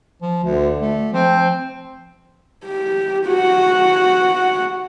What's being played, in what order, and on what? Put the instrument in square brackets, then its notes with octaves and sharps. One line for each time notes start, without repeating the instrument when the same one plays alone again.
[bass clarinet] F3
[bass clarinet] D2 [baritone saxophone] D3
[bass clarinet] A3
[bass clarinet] F3 [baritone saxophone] C4
[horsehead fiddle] G4
F#4 F#5